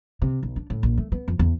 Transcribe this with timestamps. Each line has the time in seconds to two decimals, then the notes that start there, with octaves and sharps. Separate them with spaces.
0.22 C3
0.43 B1
0.56 D4
0.70 A2
0.83 A#1
0.98 A3
1.12 B3
1.28 F2
1.39 E2